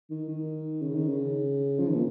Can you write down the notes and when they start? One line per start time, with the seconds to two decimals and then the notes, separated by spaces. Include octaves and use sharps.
0.10 D#3
0.28 D#3
0.81 C#3
0.95 D#3
1.09 C#3
1.80 F3
1.89 D#3
1.95 A#2